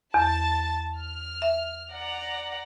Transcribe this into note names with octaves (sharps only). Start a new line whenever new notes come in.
E2 A5 A6
F6
E5
D5 F#5 A#5